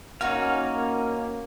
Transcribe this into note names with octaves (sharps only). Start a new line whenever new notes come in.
A#3 C#4 D#4 F#4 C#5 F5